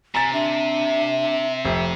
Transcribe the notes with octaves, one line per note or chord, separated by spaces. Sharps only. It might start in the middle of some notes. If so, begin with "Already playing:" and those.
C3 G#5 A#5 A6
D4 E5
F1